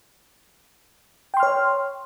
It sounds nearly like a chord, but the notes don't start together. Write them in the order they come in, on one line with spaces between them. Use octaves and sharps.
G5 C6 F6 C#5